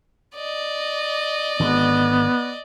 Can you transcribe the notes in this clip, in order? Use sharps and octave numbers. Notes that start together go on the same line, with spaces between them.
D5 D#5
G#1 D3 B3